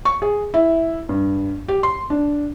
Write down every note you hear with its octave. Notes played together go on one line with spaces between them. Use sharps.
C#6
G#4
E4
G2
G4
C6
D4